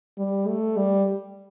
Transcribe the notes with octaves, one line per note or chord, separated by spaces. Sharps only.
G3
A3
G3